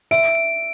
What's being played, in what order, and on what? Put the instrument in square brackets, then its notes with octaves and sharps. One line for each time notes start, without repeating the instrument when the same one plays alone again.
[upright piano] E5 [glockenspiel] D7
[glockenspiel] D7